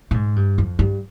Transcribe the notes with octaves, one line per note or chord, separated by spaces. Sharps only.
A#2
G#2
G2
F2
G2